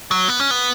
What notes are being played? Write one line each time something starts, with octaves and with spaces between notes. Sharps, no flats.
F#3
B3
C#4
B3